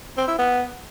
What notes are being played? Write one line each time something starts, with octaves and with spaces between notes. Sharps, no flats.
C4
E4
B3